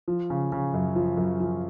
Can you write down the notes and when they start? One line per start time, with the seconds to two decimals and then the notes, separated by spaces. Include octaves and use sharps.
0.08 F3
0.30 C#3
0.52 C#3
0.74 F#2
0.95 F3
1.17 F#2
1.40 F3